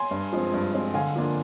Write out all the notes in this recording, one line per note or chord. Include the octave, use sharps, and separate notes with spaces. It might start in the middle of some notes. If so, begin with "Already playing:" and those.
Already playing: G#5 C6
G2
F3 G#3 C4
G2
F3 G#3 C4
D3 F5 G#5
F3 A#3 D4 F4